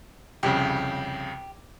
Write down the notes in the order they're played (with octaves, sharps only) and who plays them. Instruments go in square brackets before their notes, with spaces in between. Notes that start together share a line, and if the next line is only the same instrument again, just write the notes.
[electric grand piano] C2 F2 C#3 [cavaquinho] G4